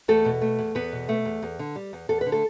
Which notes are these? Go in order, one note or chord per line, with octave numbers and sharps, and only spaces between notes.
E2 A3 A4
B2
A3
E2
E2 B3 B4
B2
A3
E2
E2
D3
G3
E2
E2 A4
B4
D3
A3 A4